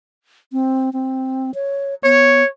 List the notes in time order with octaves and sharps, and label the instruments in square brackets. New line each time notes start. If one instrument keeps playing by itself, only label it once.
[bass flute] C4
C4
C#5
[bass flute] B3 [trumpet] C#5